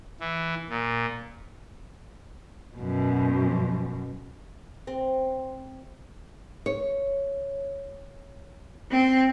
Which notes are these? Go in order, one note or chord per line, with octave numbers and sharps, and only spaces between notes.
E3
A#2
F#2 B2
C4
C#5
C4